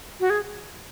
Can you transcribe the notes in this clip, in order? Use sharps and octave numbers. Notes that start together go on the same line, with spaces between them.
F#4
G#4